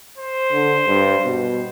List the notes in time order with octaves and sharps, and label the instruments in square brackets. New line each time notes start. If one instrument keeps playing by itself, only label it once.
[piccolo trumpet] C5
[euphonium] D3
G2
B2